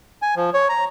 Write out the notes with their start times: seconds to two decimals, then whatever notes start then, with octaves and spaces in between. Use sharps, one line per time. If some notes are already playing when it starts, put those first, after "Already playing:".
0.22 G#5
0.36 F3
0.54 C#5
0.69 A#5